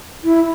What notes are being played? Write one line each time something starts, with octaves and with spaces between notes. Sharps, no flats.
E4